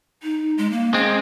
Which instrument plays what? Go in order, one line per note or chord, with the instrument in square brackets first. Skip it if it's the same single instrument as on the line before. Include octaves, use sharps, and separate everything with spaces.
[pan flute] D#4
G#3
A#3
[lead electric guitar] G#3 C4 [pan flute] C#4